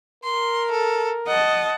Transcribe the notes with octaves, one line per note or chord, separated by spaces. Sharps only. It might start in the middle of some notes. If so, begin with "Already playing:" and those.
A#4 C6
A4
D#5 F#5 A5